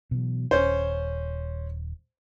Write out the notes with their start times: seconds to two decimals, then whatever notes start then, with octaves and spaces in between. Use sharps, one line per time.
0.11 B2 E3 F#3
0.51 D#1 C#4 C5